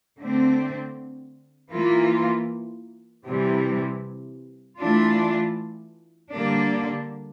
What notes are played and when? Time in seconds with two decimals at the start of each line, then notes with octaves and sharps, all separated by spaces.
0.19 D3 A3 C4
1.71 E3 A#3 F4
3.25 C3 E3 G3
4.79 E3 A3 D4 F4
6.32 D3 G3 A#3 D4